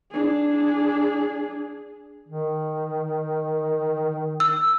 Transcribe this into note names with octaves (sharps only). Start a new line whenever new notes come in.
D4 G#4
D#3
E6